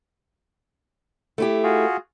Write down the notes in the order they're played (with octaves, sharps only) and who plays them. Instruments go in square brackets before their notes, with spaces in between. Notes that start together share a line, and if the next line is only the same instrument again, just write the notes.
[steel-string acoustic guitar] A3 E4 G4
[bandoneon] F4 F#4 G#4